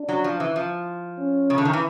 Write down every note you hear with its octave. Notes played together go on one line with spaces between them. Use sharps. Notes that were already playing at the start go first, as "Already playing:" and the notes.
Already playing: D4
F#3
F3
E3
F3
C#4
C#3
D3
D#3
E3